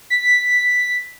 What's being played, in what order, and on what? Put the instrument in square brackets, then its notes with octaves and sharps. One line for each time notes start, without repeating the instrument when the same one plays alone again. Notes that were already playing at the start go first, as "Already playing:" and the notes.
[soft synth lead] B6